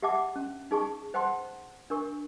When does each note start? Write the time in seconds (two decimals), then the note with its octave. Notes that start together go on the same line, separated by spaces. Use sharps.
0.02 G4 E5 F#5 A5 D6
0.36 C#4
0.71 D#4 G#4 A5 C#6
1.14 C5 F#5 G5 A5 C6
1.90 D4 A#4 C#6